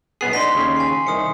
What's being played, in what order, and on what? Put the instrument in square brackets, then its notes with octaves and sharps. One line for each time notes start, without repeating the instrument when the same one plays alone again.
[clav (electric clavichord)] B1 B3 G#4 [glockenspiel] C7
[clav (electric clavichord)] D4 D#4 [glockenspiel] C6 B6
[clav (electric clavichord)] D#2 C#3
[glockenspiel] G#5 C7
[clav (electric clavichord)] C2 D#3 [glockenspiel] D#6 C#7